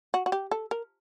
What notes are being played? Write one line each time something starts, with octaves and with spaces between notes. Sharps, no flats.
F#4
F#4
G4
A4
A#4